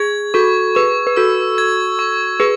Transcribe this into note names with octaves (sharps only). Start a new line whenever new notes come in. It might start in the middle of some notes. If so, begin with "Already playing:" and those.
Already playing: G#4 G#6
F#4 A4 C#6
G#4 B4 C#6
B4
F#4 A4 E6
G#6
C#6
G#4 B4 C#6